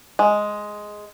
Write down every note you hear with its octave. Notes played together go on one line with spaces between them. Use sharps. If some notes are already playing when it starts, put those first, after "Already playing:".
G#3